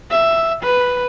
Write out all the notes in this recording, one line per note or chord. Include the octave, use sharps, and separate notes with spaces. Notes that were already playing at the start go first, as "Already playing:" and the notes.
E5
B4